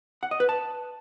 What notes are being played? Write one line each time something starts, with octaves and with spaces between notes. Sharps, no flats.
F#5
D#5
B4
A5